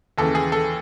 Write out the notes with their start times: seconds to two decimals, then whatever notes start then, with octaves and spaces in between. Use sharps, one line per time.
0.18 D#2 C#3 E3 A4
0.35 G#4
0.52 A4